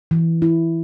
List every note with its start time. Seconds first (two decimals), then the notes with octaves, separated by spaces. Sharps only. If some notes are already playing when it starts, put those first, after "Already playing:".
0.11 E3
0.42 E4